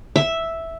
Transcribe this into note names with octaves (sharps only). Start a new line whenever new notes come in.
E5